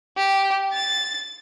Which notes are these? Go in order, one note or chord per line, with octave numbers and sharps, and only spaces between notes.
G4
A6